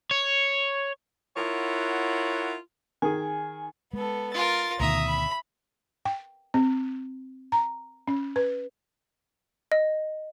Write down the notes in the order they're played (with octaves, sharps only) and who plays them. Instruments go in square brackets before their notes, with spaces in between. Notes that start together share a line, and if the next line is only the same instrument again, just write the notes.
[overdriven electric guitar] C#5
[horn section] E4 F4 A#4 C#5 F#5
[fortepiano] D#3 G#4 [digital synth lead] G#5
[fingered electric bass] G#3 [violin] B3 A4
[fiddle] F4 A#4 [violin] A6
[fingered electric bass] D2 B2 D#3 [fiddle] E5 [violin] A#5 D#6
[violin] B5
[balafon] G5
C4
A#5
C#4
B4
[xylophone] D#5